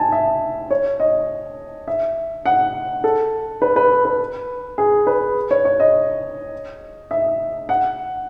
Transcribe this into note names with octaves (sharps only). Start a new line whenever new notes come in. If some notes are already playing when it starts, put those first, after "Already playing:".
Already playing: G#5 A5
E5
C#5
D#5
E5
F#5
A4
B4
B4
B4
G#4
B4
C#5
C#5
D#5
E5
F#5